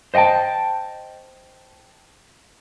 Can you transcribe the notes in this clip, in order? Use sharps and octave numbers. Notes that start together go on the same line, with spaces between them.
C5 D#5 F#5 G5 A5